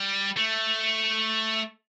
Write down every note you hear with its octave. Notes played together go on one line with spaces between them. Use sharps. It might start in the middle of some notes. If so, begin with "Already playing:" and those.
Already playing: G3
A3